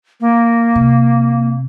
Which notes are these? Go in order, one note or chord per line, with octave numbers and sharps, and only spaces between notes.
A#3
C3